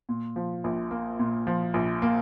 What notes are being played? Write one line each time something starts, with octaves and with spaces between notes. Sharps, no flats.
A#2
F3
A#1
A#3
A#2
F3
A#1
A#3